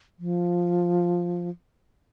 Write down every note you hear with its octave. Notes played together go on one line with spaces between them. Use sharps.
F3